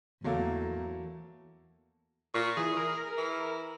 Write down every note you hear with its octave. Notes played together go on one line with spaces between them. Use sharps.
E2 F#3 A3 A#3
A#2 C#6
E3 G#4
A#4
E3